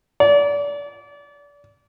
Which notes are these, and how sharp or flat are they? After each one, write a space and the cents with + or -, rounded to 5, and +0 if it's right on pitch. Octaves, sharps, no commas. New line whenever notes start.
D5 -30